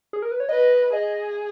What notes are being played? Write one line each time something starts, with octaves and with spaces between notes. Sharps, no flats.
G#4
A#4
B4
C#5
B4 D#5
G#4 D#5